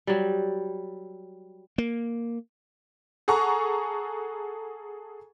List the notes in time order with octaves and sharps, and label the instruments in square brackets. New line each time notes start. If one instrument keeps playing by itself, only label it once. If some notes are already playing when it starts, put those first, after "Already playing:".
[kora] F#3 G3
[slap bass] A#3
[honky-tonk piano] G#4 A4 F#5 A#5 C#6